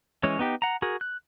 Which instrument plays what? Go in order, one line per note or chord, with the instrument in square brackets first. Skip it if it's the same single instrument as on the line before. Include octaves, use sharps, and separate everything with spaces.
[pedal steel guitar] E3 G#3 C#4 C#5
B3 D#4 G4
F#5 A#5
F#4 G#4 A#4
F#6